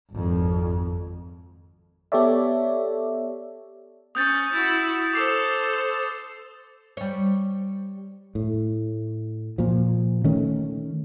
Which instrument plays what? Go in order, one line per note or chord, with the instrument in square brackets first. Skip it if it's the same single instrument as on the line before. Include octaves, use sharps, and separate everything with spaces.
[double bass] G#1 F2
[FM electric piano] B3 G4 A4 C#5 D5 E5
[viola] C#4 [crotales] D#6 G6 A6
[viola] E4 F#4
[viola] A4 C5 [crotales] D6 D#6 C7
[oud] G3 C#5
[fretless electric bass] A2
A#2 F3
D#3 A3 C#4